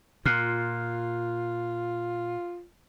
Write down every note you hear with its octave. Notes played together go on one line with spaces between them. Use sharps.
A#2 F4 F6 F#6 C7